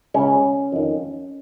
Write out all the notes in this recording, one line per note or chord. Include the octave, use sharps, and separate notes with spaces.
C#2 C#3 C#4
F2 D#3